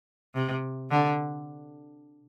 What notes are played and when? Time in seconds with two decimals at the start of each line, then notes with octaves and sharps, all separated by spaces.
0.35 C3
0.91 D3